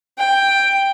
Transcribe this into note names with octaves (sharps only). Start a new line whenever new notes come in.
G5